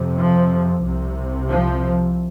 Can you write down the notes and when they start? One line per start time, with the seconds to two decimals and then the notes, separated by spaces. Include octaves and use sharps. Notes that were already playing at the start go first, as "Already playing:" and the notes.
Already playing: F2 C3
0.19 F3
0.84 C2 C3
1.49 F3